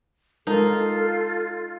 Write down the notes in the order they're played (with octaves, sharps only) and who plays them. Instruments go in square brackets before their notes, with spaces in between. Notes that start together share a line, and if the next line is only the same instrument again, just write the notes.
[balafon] G#3 A#4 A5 [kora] D#4 [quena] F4 [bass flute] A4